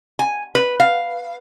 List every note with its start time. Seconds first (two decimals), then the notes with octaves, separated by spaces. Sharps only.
0.19 G#5
0.55 B4
0.80 F5